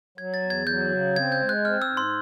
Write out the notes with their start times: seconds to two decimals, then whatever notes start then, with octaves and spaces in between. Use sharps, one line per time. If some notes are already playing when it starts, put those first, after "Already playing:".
0.18 F#3 G#6
0.34 A6
0.43 E2
0.50 G#6
0.67 F#3 G6
0.92 C#3
1.16 C4 G#6
1.32 G6
1.41 G#3
1.49 F#6
1.65 C4 F6
1.82 E6
1.90 G#2
1.97 C6